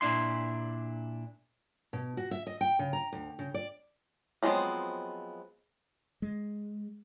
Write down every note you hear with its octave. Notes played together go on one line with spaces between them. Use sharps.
A#2 D4 E4 C6
B2
F#4
E5
D#5
G5
C#3
A#5
D2
C#3
D5
F3 F#3 G#3 B3 C4
G#3